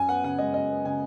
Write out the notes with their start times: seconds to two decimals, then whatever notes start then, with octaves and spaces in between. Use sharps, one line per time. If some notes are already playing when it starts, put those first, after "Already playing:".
Already playing: F#2 G#5
0.08 B3 F#5
0.24 C#3 F#5
0.38 G#3 D#5
0.54 F#2 D#5
0.70 B3
0.85 C#3 G#5